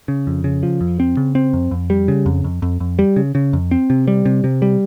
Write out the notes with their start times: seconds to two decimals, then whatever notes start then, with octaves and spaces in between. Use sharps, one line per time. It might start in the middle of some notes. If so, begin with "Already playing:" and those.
0.08 C#3
0.27 F2
0.44 C#3
0.63 F3
0.81 F2
1.00 C4
1.17 C#3
1.35 C4
1.53 F2
1.71 F2
1.90 G3
2.08 C#3
2.26 F2
2.44 F2
2.62 F2
2.80 F2
2.99 G3
3.16 C#3
3.35 C#3
3.53 F2
3.71 C4
3.90 C3
4.08 G3
4.25 C3
4.44 C3
4.62 G3